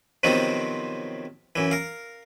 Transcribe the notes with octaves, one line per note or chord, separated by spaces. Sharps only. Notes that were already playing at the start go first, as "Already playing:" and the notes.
C3 D#3 F3 F#3 B3 C4
F#2 E3
A#4 F5